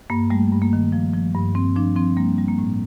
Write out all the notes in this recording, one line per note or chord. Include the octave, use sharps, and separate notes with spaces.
G2 A#3
G3 A3
G2
A#3
D#3
F3
F3
G2
G2 C4
F3 D4
F3 C4
G3 A#3
G3
A#3
A2